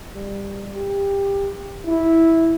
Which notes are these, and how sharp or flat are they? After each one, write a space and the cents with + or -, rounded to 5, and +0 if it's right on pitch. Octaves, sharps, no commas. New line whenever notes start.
G3 +20
G4 +20
E4 -5